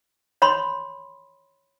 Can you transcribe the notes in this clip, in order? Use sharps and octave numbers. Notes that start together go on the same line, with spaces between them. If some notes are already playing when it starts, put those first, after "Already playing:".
C#5 B5 C6